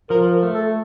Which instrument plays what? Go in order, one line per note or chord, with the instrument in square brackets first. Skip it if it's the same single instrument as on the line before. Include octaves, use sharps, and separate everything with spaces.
[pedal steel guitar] F3 [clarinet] A#4
[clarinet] A#4
[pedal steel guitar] A3
[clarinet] A4